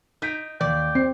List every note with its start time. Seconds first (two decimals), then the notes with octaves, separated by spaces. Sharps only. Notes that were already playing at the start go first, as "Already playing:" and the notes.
0.22 D#4 G6 B6 D7
0.61 D#2 D5 G5
0.95 C4 C7